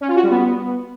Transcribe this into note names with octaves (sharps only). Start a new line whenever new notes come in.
C#4
F4
F#4
G3
B3